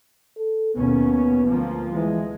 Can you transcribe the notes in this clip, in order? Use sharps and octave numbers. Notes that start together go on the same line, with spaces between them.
A4
D#2 B2 B3 C#4
D2 F3 A#3
E3 G#3